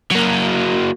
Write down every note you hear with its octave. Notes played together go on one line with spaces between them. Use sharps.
F#3 A#3